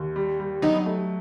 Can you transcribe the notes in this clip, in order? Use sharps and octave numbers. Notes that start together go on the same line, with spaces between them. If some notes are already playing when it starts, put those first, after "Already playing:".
Already playing: D#2
G3
G3
F#3 B3 D#4
A3